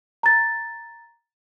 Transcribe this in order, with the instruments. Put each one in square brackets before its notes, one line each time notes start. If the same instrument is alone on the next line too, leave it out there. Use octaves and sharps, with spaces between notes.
[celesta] A#5 A6